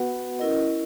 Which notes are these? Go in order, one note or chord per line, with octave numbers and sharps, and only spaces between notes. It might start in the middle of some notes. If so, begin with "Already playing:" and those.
Already playing: B3 F#4 B4 F#5
C#4 E4 A#4 D#5